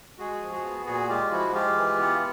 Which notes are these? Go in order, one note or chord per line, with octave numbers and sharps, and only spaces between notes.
G#3 F#4 G#4
F3
F#4 G#4
B3
A#2 F#4 G#4
G#3 F4 G4
F3 E4 F#4
G#3 F4 G4
E3
B3